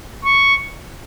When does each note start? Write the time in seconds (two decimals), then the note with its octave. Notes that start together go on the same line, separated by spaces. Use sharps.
0.25 C#6